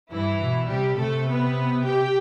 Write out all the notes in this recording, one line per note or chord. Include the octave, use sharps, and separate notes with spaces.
G2 E3 E4
B2
C3 G3 G4
C3 A3 A4
B3 B4
G4 G5